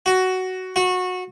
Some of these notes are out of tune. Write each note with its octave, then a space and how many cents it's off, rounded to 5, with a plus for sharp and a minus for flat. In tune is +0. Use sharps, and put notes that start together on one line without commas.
F#4 +10
F#4 -20